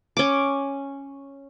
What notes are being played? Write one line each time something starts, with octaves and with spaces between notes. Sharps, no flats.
C#4 D6